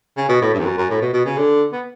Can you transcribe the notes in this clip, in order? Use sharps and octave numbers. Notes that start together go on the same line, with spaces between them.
C#3
B2
A2
G2
E2
F#2
F#2
A2
B2
B2
C#3
D3
B3